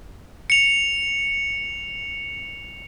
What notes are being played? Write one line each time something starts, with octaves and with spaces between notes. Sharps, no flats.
C#7 F7